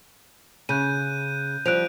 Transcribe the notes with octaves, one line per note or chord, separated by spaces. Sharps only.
C#3 F#6 G6 D#7
F3 G3 F#6 D7 F7